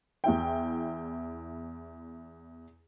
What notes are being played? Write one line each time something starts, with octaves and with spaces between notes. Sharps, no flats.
E2 E4 G5